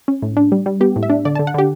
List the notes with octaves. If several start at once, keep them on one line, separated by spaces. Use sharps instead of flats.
C#4
A2
D4
G3
G3
B3 G4
A2
E5
D4
D3 D5
D3 A5
F#5
D3 G4